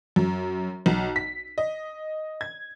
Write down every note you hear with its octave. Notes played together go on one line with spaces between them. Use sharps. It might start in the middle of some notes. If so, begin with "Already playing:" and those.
F#2
B1
B6
D#5
G#6